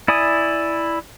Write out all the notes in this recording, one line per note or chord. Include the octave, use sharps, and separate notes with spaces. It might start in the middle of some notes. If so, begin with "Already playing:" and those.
E4 D5 G#5 D#6